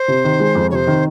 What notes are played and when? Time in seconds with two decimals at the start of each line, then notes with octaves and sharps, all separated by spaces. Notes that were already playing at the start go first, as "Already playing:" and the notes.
Already playing: C5
0.08 C3
0.25 D#3
0.40 G#3
0.55 F2
0.71 C3 C5 C#5
0.87 D#3